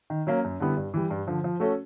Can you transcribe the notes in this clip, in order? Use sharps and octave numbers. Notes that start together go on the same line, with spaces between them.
D#3
F#3 A#3 C#4
F#2
D3 G3 B3 E4
G2
E3 G3
G2
D3 F3
F3
A3 C#4 F#4 A4